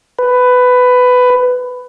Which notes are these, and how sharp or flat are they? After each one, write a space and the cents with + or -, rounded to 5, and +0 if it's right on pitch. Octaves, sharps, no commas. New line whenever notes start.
B4 +15